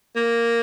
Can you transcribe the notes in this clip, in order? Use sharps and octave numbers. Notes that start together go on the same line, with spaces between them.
A#3